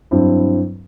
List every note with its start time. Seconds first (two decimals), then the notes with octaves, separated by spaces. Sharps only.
0.11 G2 F#3 C4 E4